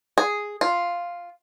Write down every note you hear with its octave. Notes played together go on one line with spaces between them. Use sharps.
G#4
F4